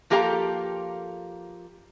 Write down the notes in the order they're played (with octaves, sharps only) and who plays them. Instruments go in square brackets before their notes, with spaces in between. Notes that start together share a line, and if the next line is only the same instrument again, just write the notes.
[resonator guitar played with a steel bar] F3 A#3 G4 A4 F5 A#5